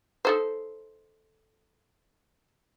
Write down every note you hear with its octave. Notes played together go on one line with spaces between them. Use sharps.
D#4 A4 C5